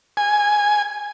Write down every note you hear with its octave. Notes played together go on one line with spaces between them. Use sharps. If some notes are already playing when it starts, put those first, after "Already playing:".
G#5